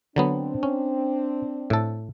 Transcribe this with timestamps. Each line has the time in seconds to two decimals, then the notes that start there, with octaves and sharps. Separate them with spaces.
0.16 D3 F#3 B3 C4 D4
0.63 C#4
1.70 A2 A4